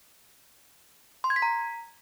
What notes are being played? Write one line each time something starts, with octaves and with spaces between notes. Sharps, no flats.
C6
G#6
B6
A#5